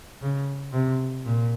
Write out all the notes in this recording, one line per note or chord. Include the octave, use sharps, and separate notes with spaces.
C#3
C3
A#2